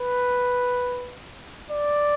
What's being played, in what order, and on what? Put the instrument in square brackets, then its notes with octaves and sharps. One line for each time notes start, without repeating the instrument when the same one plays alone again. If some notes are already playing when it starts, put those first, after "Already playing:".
Already playing: [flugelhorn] B4
D5